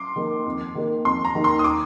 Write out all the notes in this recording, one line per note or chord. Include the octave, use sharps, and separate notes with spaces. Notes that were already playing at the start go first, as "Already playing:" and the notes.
Already playing: C6 D6
D#3 A#3 D#4
F2
D#3 A#3 D#4
F2 C6
A#5
D#3 A#3 D#4
C6
D#6
D6